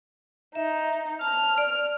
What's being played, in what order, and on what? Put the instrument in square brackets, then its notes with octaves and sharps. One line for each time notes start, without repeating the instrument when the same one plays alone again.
[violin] D#4 [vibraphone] E5
[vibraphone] A5 [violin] F6
[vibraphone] D5